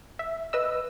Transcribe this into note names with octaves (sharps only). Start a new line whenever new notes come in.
E5
B4 D#5 E6